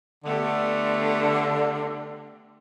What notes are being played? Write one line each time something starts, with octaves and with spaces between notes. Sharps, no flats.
D3 A3 B3 G4